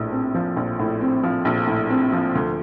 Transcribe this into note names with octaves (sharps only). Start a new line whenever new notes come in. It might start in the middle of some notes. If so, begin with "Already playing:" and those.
Already playing: A#1 A2
C4
F3
A#1
A2
C4
F3
A#1
A2
C4
F3
D2